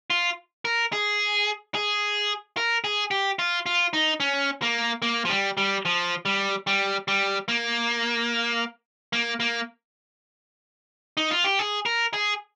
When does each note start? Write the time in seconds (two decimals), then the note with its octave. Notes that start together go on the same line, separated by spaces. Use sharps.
0.10 F4
0.65 A#4
0.93 G#4
1.75 G#4
2.57 A#4
2.84 G#4
3.11 G4
3.39 F4
3.66 F4
3.93 D#4
4.20 C#4
4.62 A#3
5.02 A#3
5.25 F3
5.30 G3
5.57 G3
5.85 F3
6.25 G3
6.67 G3
7.08 G3
7.48 A#3
9.13 A#3
9.40 A#3
11.17 D#4
11.31 F4
11.44 G4
11.59 G#4
11.86 A#4
12.13 G#4